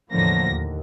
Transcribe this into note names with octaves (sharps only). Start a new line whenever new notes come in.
E2 A2 D3 F3 A#3 A#6
D#2